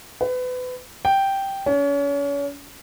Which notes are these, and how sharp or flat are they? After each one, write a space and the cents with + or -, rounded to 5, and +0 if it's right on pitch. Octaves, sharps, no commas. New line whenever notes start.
B4 +30
G5 -5
C#4 +35